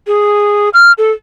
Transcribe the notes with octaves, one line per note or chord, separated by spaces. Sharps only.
G#4
F6
A4